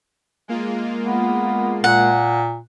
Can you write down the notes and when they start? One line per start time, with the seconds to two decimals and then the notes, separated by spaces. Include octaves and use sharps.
0.48 G#3 A#3 F4
1.04 B3
1.84 A#2 F#5